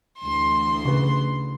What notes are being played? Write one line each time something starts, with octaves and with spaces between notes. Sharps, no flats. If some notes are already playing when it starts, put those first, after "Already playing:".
D2 E3 C6
C#3 B4